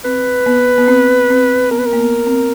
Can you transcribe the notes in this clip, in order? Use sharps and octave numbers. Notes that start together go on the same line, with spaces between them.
C4 B4
B3
B3
C4
C4
B3 A#4
B4
A#4
A#3
B3
C4